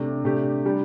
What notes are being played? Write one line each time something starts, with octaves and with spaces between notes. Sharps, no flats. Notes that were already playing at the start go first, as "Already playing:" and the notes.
Already playing: C3 A3 D4
C3 A3 D4 G4
G3 D4 G4